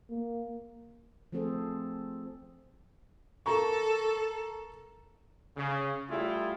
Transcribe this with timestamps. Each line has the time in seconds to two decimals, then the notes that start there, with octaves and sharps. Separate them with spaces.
0.10 A#3
1.32 F3 A3 C4 G#4 A4 C5
3.46 A4 A#4 A#5 C#6
5.57 C#3
6.09 G3 A3 E4 F4 G#4